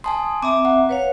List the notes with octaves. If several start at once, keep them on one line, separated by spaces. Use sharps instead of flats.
G#5 A5 C6 D#6
C4 E5 A#5 D6
F#5
B4 C#5 F5